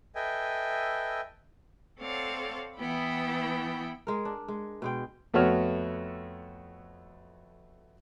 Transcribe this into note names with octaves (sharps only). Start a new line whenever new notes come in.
A4 B4 D#5 E5 G5 G#5
C4 A4 C#5 D5 F5 F#5
E3 B3 E4 G5 B5
G#3 A#4
D4
G#3
B2 G#3 G5
F2 A3 B3 F#4 C#5 F6